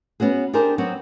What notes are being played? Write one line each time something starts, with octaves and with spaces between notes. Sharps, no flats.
B3 C#4 F#4 G#4
D4 G4 G#4 A#4 C5
F#3 B3 C4 F#4